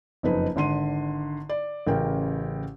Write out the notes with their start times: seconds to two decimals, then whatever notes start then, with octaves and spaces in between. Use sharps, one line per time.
0.23 F#1 F2 D#4 B4
0.56 G#1 D3 C6 D#7
1.49 D5
1.87 A1 C#3 A#4 G5